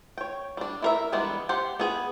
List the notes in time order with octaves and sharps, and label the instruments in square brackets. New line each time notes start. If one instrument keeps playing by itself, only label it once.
[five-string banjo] C#5 G5
G3 D4
E4 A#4 E5
E3 G3 G#3 B3 D4
G4 C5 F#5
B3 G#4